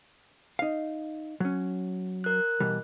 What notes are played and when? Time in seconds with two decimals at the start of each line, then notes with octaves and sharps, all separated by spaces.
0.59 D#4 F5
1.40 F#3 C#4
2.24 A#4 F#6
2.60 B2 E3 G3